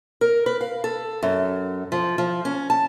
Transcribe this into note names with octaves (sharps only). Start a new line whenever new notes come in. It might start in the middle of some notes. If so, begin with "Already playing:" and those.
A#4
B4
F5
A4
F#2
F3
F3
C#4
A5